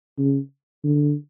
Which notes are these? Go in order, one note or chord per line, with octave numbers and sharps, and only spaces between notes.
C#3
D3